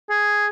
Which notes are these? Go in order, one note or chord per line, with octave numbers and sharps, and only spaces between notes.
G#4